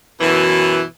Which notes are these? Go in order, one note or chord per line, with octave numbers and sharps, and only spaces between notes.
F#2 B2 E3